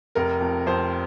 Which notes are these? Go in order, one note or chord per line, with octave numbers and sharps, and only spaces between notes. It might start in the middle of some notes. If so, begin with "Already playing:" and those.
F1 A#4
F2
F2 C5